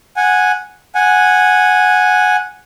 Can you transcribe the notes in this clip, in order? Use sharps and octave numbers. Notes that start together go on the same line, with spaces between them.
F#5 G#5
F#5 G#5